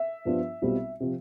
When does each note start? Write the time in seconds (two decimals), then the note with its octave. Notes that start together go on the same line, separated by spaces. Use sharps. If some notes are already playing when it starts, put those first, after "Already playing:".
Already playing: E5
0.25 G2 F3 B3 D4 F4
0.62 B1 B2 G3 C4 F4
1.00 C3 F3